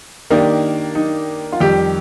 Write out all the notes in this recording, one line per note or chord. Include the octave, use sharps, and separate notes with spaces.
D#3 A#3 D4 D#4 G4
D#4
F4
F2 D#3 G3 G4